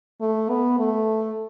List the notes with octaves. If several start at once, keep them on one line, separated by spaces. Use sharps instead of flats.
A3
B3
A3